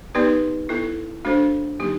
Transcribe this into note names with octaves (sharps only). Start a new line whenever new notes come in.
B3 D#4 G4 B4 D5
B3 E4 A4
A3 D4 F#4 A4 C5
D3 F#3 A#3 D#4 G4